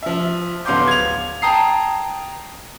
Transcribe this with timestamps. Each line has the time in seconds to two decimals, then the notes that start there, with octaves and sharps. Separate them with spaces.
0.03 F3 E5
0.65 D1 B3 F5 C6 D6 G6
0.88 G#6 F7
1.42 G5 A5 A#5 D#6 C7